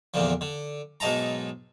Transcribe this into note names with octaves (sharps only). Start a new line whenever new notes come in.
E2 A#2 D3 F3
D3
B1 G#2 D#4 A5 A#5